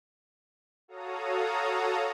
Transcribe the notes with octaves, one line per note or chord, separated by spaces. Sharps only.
F#4 A4 C#5 F5 A#5 D#6